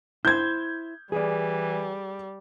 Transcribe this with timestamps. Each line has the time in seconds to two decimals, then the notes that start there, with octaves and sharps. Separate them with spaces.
0.25 E4 C5 G6 G#6
1.12 E3 G3 G#4 D5